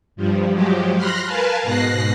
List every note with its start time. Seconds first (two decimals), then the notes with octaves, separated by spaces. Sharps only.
0.16 G2 F3 G3
0.51 F3 F#3 G#3 G4
0.96 B5 C6 F6 F#6 A#6
1.26 A#4 B4 F5 G#5 A5
1.63 G#2 B2 F#6 A#6 C7